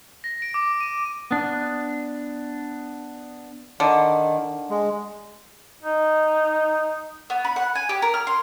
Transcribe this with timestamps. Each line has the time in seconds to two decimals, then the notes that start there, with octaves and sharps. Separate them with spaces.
0.24 A#6
0.42 D7
0.54 D6
0.80 D#7
1.31 B3 D4
3.80 D3 D#3
4.70 G#3
5.82 D#4
7.30 B3
7.45 B5
7.56 F#5
7.75 G#5
7.89 G4
8.02 A#4
8.14 F6
8.27 C6